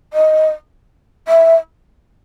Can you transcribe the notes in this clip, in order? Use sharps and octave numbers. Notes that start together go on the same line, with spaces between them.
D#5
E5